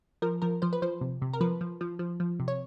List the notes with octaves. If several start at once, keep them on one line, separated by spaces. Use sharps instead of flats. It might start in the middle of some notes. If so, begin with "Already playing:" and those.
F3 A#4
F3 A#4
F3 C5
B4
F3 C5
C3
C3
A#4
F3 B4
F3
F3
F3
F3
C3
C#5